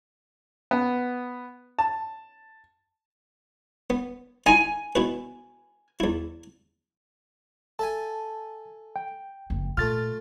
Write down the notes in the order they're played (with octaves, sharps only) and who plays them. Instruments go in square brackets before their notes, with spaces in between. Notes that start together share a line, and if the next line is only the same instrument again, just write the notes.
[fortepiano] B3
A5
[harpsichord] B3
[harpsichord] D#4 E4 [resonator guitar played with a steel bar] G#5
[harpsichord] B2 E4 B4
E2 E4
[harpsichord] A4 E5 G#5 [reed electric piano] A5
[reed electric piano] G5
[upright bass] F#1 F2
[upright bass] A#2 [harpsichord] A3 F4 [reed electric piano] F6 A6